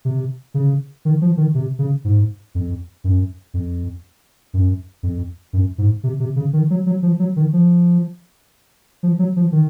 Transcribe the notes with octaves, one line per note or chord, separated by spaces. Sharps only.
C3
C#3
D#3
F3
D#3
C3
C#3
G#2
F2
F#2
F2
F#2
F2
F#2
G#2
C3
C3
C#3
D#3
F#3
F#3
F3
F#3
D#3
F3
F3
F#3
F3
D#3